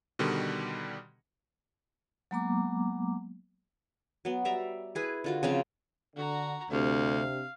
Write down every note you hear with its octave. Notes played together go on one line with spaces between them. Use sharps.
B2 D3 D#3 G3
F#3 G#3 A#3 B3 A#5 D6
F#3 B3
G3 E5 A#5
E4 G#4 B4
D3 F4 F#4
C#3 F3 C4 F5
D3 F#4 A#5
D2 C3 D4 F5